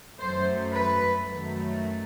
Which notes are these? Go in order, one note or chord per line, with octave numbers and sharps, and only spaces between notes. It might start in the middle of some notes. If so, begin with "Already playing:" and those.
F#2 F#3 A3 C5
B4
F#2 D#3 F#3 A3